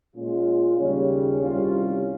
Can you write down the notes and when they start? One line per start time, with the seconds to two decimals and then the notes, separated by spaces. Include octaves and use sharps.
0.15 A#2 G#3 C#4 F4
0.77 D#2 C#3 G3 C#4
1.40 C2 C3 G3 C#4 F4